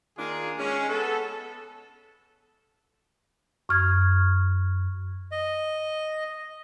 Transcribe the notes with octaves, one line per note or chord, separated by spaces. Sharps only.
D#3 A#3 D4 F4 G#4 A#4
G#3 C#4
B3 A4
F#2 C#6 F6 G#6
D#5